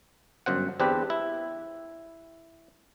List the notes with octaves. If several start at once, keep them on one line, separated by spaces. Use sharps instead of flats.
G1 F#2 C5 F#5
E2 C4 D4 G4 B4
E4